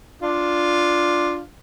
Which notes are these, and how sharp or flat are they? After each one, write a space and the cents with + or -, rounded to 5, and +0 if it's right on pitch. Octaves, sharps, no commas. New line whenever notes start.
D4 +0 F4 +0